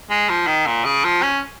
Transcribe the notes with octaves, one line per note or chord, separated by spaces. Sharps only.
G#3
F3
D#3
A#2
C#3
F3
C#4